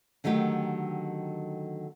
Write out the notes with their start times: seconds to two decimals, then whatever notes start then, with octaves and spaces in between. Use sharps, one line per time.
0.24 D3 D#3 F#3 A3 G4